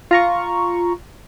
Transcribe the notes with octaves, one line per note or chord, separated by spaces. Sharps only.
F4 A#5 C#6